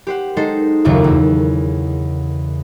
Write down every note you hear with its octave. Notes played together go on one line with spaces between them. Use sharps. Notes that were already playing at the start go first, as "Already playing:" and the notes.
G4 C5 F#5
G#3 D#4 A4 C5
F#1 D#2 C#3 F4 E5 E6
E2